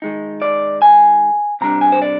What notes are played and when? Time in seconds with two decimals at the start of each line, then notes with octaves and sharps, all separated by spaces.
0.02 D#3 G#3 D#4
0.42 D5
0.82 G#5
1.61 C3 G3 D4 A#5
1.81 G#5
1.92 C5
2.02 D5